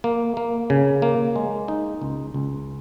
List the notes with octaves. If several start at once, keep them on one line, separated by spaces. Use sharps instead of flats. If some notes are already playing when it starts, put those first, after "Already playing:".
A#3
A#3
C#3
A#3
G#3
D#4
C#2
C#2